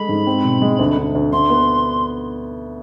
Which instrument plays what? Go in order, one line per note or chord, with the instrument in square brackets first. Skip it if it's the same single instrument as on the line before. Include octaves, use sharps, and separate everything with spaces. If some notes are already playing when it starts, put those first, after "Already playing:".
Already playing: [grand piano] G#3 A4 [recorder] B5
[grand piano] G#2
C4
B2
G#3
D2
D2
D2
[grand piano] D2 [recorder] C6
[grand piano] B3